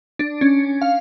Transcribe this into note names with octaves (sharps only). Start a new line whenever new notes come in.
D4
C#4
F5